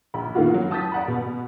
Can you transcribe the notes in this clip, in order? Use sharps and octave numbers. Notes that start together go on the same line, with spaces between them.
A#1 B5
A#2 D#3 A#3 B3 F4 F#4
E3 F#3
A5 D#6 G6 A6 B6
D5 F#5 B5
B2